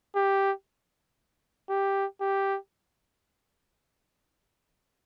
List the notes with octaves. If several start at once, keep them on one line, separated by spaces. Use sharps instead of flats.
G4
G4
G4